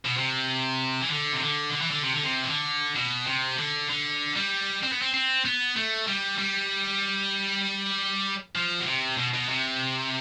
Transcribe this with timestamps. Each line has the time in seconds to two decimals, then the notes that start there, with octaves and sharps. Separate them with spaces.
0.05 B2
0.17 C3
1.01 E3
1.10 D3
1.32 C3
1.42 D3
1.72 D3
1.82 E3
1.91 D3
2.03 C3
2.13 D3
2.24 C3
2.44 E3
2.50 D3
2.96 B2
3.27 C3
3.59 D3
3.90 D3
4.36 G3
4.83 C4
4.92 B3
5.02 C4
5.14 C4
5.45 B3
5.76 A3
6.07 G3
6.38 G3
8.56 F3
8.81 B2
8.87 C3
9.18 B2
9.34 B2
9.49 C3